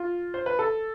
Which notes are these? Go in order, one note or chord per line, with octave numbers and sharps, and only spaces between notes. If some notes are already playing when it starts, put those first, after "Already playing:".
Already playing: F4
C5
B4
A4